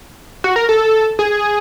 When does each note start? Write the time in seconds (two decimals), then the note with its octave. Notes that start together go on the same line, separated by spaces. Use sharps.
0.44 F#4
0.56 A#4
0.69 A4
1.19 G#4